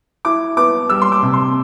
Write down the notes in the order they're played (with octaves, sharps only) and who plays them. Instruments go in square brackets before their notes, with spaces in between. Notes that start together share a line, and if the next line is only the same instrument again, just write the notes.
[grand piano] E4 [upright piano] D6
[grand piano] B3 [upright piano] D6
[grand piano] G3 [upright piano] E6
[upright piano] C6
D6
[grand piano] C3
[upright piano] C6